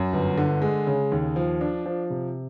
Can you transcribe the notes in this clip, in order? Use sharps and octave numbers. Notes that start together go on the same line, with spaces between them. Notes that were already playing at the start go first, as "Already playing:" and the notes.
Already playing: F#2
G1
D3
G#3
C#3
D#2
F3
D4
F3
C3